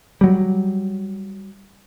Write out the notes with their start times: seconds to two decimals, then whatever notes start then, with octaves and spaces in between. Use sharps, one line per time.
0.21 F#3 G3